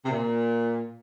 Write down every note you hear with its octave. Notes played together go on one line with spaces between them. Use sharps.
C3
A#2